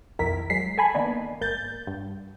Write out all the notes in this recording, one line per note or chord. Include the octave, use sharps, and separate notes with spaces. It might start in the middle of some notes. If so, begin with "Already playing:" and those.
B1 F2 D#3 E4 A#4 B6
F#3 G#3 B6 C7
A4 G#5 B5
D#3 A#3 B3 D4 D#4
G#1 A#3 G6 A6
G2